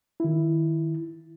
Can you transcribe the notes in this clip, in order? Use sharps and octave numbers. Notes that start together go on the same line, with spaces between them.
D#3 E4